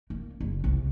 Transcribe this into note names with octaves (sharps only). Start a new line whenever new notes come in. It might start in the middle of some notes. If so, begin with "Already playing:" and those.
A#3
F#1
C2